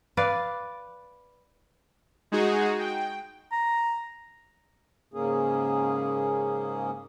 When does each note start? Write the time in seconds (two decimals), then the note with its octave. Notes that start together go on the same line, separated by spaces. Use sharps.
0.17 B4 D5 F5
2.32 G#3 D#4 F#4 G#4
2.79 G5
3.52 A#5
5.14 G#2 C#3 A#3 C#4 G#4